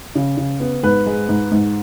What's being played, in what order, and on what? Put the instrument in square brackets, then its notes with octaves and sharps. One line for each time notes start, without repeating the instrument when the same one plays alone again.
[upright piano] C#3
C#3
B3
G#2 B4
G#3
G#2
G#2